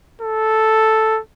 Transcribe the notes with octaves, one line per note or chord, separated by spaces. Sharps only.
A4